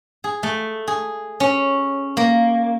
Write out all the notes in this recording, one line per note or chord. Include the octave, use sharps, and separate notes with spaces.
G#4
A3
G#4
C#4
A#3